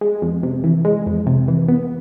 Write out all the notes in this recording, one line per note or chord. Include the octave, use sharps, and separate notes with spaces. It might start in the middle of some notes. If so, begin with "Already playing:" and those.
G#3
F2
C3
E3
G#3
F2
C3
E3
B3